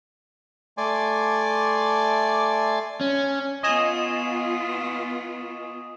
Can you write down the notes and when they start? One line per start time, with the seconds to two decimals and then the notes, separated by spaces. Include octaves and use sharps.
0.78 A3 D5 G#5 C6 D6
3.01 C#4
3.63 B3 F4 D#5 G#5 C#6 D#6 E7